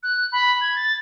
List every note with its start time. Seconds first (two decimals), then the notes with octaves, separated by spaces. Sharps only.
0.03 F#6
0.32 B5
0.61 G#6
0.75 A6